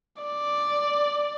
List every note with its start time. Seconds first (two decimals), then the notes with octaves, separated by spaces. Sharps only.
0.22 D5